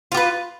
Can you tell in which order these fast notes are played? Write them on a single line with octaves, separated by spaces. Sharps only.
F4 G4 B4